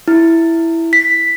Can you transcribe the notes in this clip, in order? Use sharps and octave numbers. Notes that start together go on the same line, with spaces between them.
E4
B6